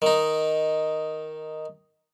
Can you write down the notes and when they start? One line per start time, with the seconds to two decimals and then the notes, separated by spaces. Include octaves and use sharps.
0.02 D#3 D#4